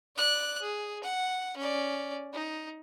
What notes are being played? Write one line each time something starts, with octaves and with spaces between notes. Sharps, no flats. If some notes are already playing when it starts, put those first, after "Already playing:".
D5 F#6
G#4
F#5
C#4 D5
D#4